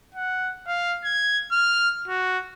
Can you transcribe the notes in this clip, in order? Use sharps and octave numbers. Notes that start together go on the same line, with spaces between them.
F#5
F5
G#6
F6
F#4